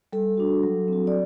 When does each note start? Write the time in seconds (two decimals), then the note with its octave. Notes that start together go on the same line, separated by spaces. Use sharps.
0.12 G3 A4
0.37 D4 F#4
0.63 F#3
0.88 C4 F#4
1.07 D5